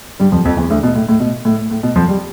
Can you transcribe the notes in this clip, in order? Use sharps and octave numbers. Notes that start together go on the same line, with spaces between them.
G2 G3
F2 F3
F2 F3
E2 E3
D2 D3
B2
A2
A2
B2
A2
A2
B2
F2 F3
G3